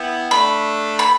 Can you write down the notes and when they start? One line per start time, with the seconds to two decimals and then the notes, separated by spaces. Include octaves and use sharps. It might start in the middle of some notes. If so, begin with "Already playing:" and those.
Already playing: B3 E4 G5
0.31 A3 D4 B5
0.99 B5